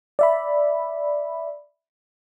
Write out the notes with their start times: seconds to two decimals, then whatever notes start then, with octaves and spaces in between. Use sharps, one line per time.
0.19 D5 E5 B5